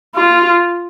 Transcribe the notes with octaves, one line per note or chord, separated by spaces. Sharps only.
F4